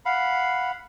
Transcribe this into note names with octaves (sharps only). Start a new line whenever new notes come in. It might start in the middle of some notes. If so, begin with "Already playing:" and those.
F5 F#5 B5